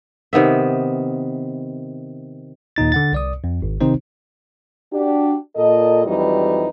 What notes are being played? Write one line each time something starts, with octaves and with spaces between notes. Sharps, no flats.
C3 D#3 B3 E5
D#2 A#2 D#4 A6
D3 F#5 A6
C2 D5 D#6
F2
G#1
C3 D#3 C4 D#4 C5
D4 F#4 G4
A#2 A4 D#5
F2 E3 F#3 G3 D#4 B4